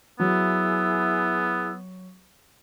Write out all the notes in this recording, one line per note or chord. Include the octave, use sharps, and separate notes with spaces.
F#3 B3 E4 G#4 E6